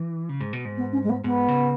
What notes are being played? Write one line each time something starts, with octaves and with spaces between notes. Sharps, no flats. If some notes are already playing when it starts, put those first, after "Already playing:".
Already playing: E3
C#3
G#2
B2
G#2
B3
C#4
G#3
B3
G#2 B3
C#3